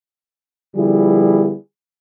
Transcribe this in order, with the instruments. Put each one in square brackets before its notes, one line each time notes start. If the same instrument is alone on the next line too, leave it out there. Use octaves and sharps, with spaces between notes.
[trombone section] D3 F3 G3 B3 E4 G#4